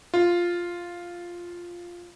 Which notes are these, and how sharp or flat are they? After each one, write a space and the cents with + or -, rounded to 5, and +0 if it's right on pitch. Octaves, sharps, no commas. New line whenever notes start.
F4 +0